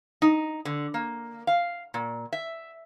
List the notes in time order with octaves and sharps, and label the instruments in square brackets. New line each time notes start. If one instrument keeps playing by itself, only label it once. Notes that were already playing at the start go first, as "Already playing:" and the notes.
[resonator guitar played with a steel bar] D#4
D3
A#3
F5
A#2
E5